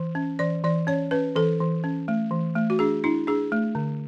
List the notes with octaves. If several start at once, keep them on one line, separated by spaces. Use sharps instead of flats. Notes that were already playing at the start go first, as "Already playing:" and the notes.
Already playing: E3
C#4
E3 D5
E3 D5
C#4 C#5
C#4 B4
E3 A4
E3
C#4
A3
E3
A3
F#4
D4 G#4
D4 E4
D4 G#4
A3
D3